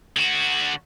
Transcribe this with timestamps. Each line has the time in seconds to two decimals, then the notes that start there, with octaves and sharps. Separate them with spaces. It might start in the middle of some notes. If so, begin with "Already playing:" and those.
0.17 D3 F#4